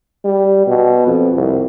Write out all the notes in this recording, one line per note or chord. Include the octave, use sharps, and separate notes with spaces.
G3
B2
F2
C2